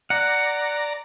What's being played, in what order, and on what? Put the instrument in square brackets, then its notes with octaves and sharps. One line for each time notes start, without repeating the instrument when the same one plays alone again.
[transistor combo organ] D5 A#5 [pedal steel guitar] F#5